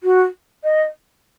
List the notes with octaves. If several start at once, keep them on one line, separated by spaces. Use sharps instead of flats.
F#4
D#5